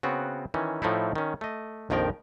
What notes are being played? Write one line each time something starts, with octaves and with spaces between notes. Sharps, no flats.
C#3 B3 C4 F#4
D#3 E3 C#4
A2 F3 A3 D#4 E4
D#3 C#4
A3 D#5
A#1 F2 D#3 F3 A#4 G5